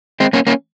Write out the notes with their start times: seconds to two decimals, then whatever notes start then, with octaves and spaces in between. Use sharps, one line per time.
0.20 G#3 C4
0.33 A#3 C#4
0.47 A#3 C#4